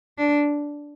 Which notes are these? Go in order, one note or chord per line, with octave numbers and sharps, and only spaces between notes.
D4